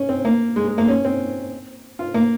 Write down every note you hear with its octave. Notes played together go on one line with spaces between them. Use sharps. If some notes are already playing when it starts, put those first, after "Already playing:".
Already playing: C#4
C4
A#3
G#3
G#3
A#3
C#4
C4
F4
A#3